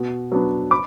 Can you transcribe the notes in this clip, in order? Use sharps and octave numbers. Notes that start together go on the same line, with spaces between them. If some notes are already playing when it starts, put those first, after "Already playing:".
Already playing: B2
F#3 B3 D4
B5 D6